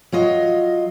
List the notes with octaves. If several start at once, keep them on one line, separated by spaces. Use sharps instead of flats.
F#3 F4 D#5